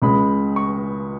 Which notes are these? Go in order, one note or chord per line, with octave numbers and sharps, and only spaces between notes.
C#2 C#3 G#3 B5
C#6